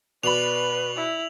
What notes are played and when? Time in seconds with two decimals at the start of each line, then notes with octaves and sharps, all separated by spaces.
0.23 B2 B4 D5 B5 F7 F#7
0.96 E4